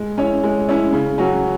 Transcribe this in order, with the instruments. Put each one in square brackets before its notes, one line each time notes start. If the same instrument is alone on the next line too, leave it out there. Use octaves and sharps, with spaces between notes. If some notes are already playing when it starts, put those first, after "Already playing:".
Already playing: [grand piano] G#3
C#4 E4 C#5
G#3
C#4 E4 C#5
C#3
F#3 C#4 F#4